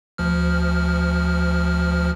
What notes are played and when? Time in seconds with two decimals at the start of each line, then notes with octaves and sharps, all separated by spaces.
0.18 D2 F3 F6